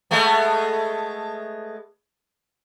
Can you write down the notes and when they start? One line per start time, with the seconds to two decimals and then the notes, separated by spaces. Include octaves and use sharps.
0.11 G#3 A3 B3